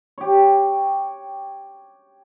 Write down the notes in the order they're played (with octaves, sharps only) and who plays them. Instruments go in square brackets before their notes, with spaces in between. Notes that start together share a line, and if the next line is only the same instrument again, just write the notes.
[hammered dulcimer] G4 C#5